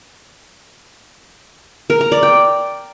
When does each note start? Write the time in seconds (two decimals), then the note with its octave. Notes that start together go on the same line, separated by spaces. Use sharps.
1.90 A#4
2.01 A#5
2.12 D5
2.23 G5